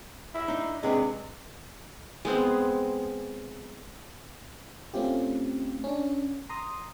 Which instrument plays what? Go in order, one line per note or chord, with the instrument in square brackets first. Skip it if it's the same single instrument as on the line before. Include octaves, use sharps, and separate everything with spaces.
[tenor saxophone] E4
[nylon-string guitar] D4 D#4
[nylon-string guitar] C3 D4 B4 [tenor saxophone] G#3
[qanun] G#3 B3 C4
[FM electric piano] A3 C4 C#4 F4 G4
C#4 D4
A#5 C6 D#6